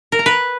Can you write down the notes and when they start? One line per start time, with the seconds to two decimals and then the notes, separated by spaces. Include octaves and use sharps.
0.12 A#4
0.19 A#5
0.26 B4